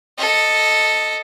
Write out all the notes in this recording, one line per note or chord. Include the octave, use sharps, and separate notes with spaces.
A4 D#5